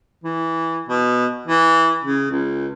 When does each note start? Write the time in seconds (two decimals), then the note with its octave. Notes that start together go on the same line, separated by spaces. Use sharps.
0.24 E3
0.89 B2
1.47 E3
2.05 C#3
2.31 C#2